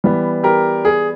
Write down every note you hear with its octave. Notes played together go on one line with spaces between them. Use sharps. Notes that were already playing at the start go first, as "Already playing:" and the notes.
E3 G3 B3
G4 A#4
G#4